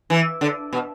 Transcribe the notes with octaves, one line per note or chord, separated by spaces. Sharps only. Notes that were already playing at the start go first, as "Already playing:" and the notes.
E3
D3
B2